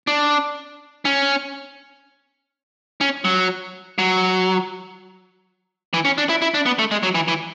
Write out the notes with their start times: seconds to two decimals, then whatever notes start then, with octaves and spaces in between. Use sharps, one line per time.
0.07 D4
1.05 C#4
3.01 C#4
3.25 F#3
3.98 F#3
5.94 E3
6.05 C#4
6.18 D4
6.29 E4
6.42 E4
6.54 D4
6.66 B3
6.79 A3
6.91 G#3
7.03 F#3
7.15 E3
7.28 E3